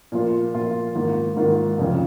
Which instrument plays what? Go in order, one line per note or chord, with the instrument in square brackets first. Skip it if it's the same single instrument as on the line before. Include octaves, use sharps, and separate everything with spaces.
[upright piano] A#2 F3 A#3 F4
A#2 F3 A#3 F4
G#2 D#3 A#3 F4
G#2 D#3 A#3 F4
F1 F2 C#3 F3